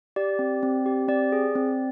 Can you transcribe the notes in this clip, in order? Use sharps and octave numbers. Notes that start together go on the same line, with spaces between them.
G4 D5
C4
C4
G4
C4 D5
G#4
C4